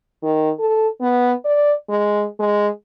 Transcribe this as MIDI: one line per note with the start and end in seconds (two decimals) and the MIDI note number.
0.23 0.50 51
0.59 0.87 69
1.01 1.32 59
1.44 1.73 74
1.89 2.25 56
2.39 2.68 56